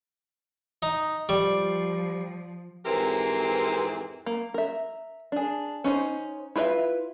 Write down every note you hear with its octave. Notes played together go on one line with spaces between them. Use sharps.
D#4
F3 G3 C#6
F2 G#2 E3 C4 G4 A#4
A#3
A#4 E5
D4 G#4
C#4 D#4 E4 C5
E4 F4 B4 D#5 E5